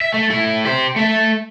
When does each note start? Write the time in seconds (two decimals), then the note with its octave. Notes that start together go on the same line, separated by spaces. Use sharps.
0.01 E5
0.14 A3
0.30 A3 E4
0.65 G4 C5
0.96 A3 E5